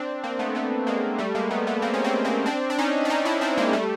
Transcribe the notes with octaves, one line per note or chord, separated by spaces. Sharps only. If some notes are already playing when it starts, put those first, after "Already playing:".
Already playing: C4 D4
A#3 C4
A3 B3
A3 B3
G#3 A#3
G3 A3
G#3 A#3
A3 B3
A3 B3
A#3 C4
C#4
A#3 C4
A#3 C4
C4 D4
D4
C#4 D#4
D4
C#4 D#4
D4 E4
C4 D4
G#3 A#3
G3 A3